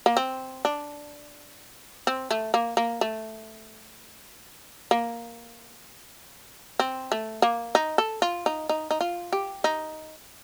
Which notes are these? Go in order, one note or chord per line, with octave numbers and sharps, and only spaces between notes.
A#3
C4
D4
C4
A3
A#3
A#3
A3
A#3
C4
A3
A#3
D#4
A4
F4
D#4
D#4
D#4
F4
G4
D#4